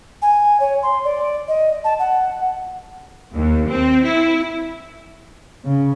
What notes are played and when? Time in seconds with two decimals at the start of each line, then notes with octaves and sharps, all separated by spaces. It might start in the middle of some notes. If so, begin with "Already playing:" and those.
0.22 G#5
0.60 C#5
0.83 C6
1.05 D5
1.48 D#5
1.84 A5
1.99 F#5
3.34 D#2
3.69 C4
4.05 E4
5.65 C#3